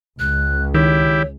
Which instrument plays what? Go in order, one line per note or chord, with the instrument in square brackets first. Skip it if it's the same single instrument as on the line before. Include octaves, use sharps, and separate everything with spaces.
[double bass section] C#2 [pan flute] F#6
[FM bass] D#3 [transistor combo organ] E4 G4 [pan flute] C#5